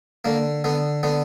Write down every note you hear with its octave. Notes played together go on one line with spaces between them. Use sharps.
D3 A#3
D3 B3
D3 B3